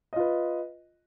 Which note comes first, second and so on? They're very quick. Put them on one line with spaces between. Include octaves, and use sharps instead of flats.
D#5 F4 B4